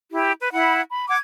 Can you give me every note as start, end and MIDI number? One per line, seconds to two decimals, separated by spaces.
0.11 0.32 64
0.11 0.32 67
0.40 0.48 71
0.52 0.80 64
0.52 0.80 78
0.52 0.80 83
0.89 1.05 83
1.07 1.16 78
1.07 1.16 86
1.07 1.16 92